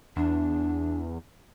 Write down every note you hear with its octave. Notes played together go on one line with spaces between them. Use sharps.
E2 D4